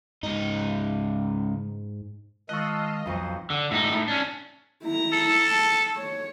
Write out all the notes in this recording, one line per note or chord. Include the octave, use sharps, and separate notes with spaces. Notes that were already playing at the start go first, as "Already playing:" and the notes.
C#2 G#2 D#4
D#3 G#3 F4 D#5 A5 C#6 E6 F#6
B1 F2 C5
D3
A2 D#4
A2
C#4 D4
E4 A#5
A4
A5
C#5